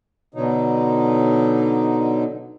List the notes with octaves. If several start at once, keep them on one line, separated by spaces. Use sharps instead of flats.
B2 D3 F#3 D#4